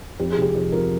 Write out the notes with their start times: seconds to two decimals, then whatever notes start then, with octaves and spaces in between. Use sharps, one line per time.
0.19 F2 G4
0.30 G#4
0.38 C3 G4
0.55 F2
0.72 F3 A#4